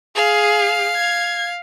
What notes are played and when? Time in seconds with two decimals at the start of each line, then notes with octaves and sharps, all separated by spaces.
0.15 G#4 F5
0.96 G#6